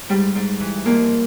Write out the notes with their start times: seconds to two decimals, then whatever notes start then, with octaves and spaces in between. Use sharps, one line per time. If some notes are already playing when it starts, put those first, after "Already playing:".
0.09 G#2 G3
0.35 G#2
0.60 E3
0.86 F2 A#3